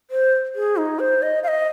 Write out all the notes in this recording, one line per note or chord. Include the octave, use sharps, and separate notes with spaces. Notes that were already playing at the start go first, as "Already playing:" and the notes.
C5
G#4
D#4
C5
D#5
F5
D#5